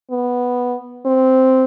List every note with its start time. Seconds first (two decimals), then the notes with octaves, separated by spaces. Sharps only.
0.11 B3
1.06 C4